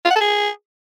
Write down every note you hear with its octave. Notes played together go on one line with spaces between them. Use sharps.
F4
F#5
A4
G#4